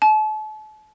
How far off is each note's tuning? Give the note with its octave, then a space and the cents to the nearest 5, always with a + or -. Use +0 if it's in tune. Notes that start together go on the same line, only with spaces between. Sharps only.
A5 -40